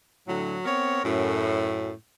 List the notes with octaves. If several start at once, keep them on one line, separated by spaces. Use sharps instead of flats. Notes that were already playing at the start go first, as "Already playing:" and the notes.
A2 D3 F#3
B3 C4 A#4 C#5
F#2 A2